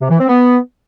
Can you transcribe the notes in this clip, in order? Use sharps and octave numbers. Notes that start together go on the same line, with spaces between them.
C3
E3
C4
B3